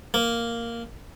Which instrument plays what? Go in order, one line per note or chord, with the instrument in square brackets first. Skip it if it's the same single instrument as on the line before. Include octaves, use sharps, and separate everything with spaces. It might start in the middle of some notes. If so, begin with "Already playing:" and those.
[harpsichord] A#3